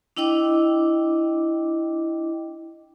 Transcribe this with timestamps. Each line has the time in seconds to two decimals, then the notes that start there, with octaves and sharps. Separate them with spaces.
0.17 D4 E4 D#5 G5 D6